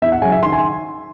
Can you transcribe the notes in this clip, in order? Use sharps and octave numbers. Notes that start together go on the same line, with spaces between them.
E2 E5
F#5
C#3 F#3 G#5
E5
D#3 C6
G#5